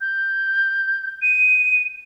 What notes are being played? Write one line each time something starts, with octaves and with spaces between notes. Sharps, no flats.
G6
D#7